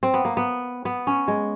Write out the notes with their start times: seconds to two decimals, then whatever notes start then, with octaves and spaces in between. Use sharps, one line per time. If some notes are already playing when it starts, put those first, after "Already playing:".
0.03 C4
0.14 B3
0.25 A#3
0.37 B3
0.85 B3
1.07 C#4
1.28 G#3